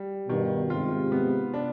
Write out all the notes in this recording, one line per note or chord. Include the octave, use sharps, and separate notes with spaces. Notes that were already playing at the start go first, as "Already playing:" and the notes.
Already playing: G3
G2 B2 D#3
G#2 C3 F4
B3
D4